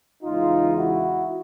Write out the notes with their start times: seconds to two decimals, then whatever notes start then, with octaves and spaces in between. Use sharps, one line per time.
0.24 E2 C#3 E3 G#3 D#4 F4
0.76 E4 F#4